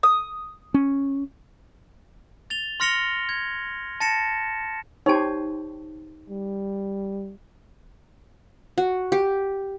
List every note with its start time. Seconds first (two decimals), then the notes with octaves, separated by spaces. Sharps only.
0.03 D#6
0.74 C#4
2.50 A6 F7 G7
2.80 C6 F6 A#6 C#7 F7 G7
3.29 G#6
4.00 A5 A6 A#6 C#7 E7
5.06 D#4 G4 C5 C#5 A5
6.30 G3
8.78 F#4
9.12 G4